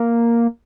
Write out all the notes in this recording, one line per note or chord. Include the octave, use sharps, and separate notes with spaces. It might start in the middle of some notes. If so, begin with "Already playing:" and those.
Already playing: A#3